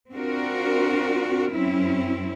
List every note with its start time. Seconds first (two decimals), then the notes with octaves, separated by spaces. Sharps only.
0.11 C4 D4 F4 F#4 A#4
1.51 F#2 C4 C#4 E4